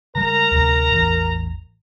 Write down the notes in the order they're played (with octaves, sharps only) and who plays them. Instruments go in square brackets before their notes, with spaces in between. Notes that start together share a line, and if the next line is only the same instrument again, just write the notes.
[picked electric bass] C#3 G3 G#3 [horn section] A#4 A#5
[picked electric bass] D2 C3 F3
A1 E2